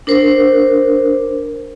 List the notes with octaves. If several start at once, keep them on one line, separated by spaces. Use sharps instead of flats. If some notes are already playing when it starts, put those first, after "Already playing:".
D4 A#4 C5